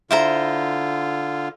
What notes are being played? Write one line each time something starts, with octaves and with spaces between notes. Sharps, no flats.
D3 E4 F4 C5 A#5